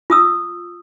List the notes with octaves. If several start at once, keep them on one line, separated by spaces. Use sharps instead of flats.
F4 D#6 E6